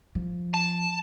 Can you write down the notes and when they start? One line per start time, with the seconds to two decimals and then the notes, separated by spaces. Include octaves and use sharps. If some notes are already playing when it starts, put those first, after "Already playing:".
0.15 F3
0.54 A5